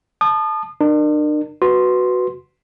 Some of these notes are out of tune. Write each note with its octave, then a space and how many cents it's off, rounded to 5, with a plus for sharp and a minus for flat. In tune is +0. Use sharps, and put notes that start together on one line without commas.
A5 -5 D#6 -35
D4 +40 A#4 +0
F#4 +0 B4 +5 C6 +0